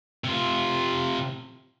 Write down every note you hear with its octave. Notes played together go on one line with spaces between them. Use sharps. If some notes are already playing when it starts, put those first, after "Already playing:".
C3 F4